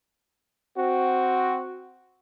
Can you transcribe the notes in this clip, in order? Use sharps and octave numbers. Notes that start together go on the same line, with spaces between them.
C4 F#4